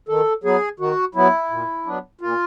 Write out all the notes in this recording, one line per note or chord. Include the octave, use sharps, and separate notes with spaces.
D#3 A4
F#3 B3 G#4
D#3 F#4
F#3 B3 E4
A#2
F#3 B3 D4
A#2 F4